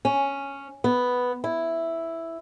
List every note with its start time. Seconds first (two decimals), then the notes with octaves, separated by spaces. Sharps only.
0.05 C#4
0.84 B3
1.44 E4